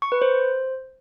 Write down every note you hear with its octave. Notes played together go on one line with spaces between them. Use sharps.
C#6
B4
C5